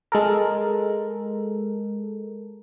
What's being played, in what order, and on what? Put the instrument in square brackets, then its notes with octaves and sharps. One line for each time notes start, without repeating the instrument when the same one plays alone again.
[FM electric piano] G#3 A4 A#4